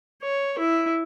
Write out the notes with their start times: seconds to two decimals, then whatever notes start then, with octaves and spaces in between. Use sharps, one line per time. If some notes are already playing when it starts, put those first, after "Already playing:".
0.22 C#5
0.58 E4